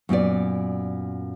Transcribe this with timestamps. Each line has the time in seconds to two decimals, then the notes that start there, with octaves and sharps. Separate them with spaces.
0.09 F#2 A#2 B3 D5